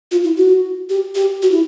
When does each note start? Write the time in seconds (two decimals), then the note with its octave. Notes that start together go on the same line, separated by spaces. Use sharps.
0.11 F4
0.24 E4
0.37 F#4
0.89 G4
1.15 G4
1.42 F#4
1.51 E4